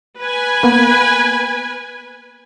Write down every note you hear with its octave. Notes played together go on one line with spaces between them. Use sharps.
B4 G#5
A#3 B3